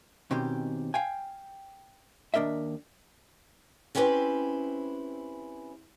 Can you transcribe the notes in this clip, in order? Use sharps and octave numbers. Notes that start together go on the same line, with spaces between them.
B2 D#3 C4 C#4 G4
F5 G5 G#5
D#2 D4 A#4 D#5 E5
C4 C#4 E4 G4 B4 C5